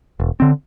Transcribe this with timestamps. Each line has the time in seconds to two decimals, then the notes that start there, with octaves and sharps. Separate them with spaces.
0.20 E1
0.40 D3 C4